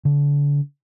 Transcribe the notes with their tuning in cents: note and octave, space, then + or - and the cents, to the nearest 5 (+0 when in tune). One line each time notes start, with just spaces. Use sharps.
D3 -35